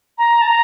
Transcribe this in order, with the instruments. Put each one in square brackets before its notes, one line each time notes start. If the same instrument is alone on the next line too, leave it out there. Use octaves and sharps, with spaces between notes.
[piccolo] A#5
A5
A#5